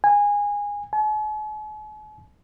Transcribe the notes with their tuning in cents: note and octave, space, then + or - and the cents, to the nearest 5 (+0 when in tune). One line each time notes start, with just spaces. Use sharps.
G#5 -20
G#5 +45